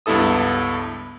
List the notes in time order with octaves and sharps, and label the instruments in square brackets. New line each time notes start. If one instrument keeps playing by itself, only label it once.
[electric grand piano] C#2 G2 B3 E4 A4 D#6